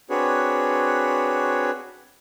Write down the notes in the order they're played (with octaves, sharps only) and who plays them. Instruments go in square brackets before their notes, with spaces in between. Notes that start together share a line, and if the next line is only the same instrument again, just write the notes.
[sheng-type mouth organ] C4 D4 F#4 G#4 B4 C#5